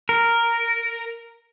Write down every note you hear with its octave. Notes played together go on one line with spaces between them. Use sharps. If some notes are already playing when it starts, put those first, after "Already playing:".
A#4